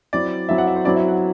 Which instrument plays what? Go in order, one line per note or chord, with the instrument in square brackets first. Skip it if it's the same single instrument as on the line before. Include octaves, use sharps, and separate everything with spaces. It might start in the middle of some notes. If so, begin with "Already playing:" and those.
[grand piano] F#3 C4 E4 [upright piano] D5
[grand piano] F#3 C4 E4 [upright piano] E5
[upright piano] F#5
E5
C5
[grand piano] F#3 C4 E4 [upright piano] D5
[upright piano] E5
F#5